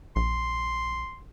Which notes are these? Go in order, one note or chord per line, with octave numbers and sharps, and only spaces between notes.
A#1 C6